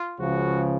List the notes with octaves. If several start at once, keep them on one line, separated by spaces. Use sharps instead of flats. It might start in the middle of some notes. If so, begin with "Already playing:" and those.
Already playing: F4
C#2 C#3 F3 F#4